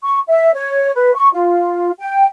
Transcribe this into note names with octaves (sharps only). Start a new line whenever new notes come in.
C#6
E5
C#5
B4
C#6
F4
G5